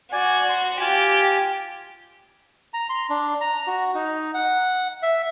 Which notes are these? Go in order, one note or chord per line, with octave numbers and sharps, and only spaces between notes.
F#4 D5 G#5
C6
F4 G4 G#5
A#5
C6
D4
A#5
F#4
D#4
F#5
E5